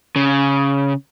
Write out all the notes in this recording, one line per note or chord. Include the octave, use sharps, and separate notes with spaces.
C#3